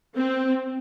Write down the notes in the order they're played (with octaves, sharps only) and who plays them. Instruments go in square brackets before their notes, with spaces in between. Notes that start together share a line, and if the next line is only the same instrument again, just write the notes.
[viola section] C4